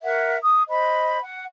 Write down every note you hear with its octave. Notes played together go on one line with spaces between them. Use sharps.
A#4 E5 F#5
D#6
C5 D#5 B5
F#5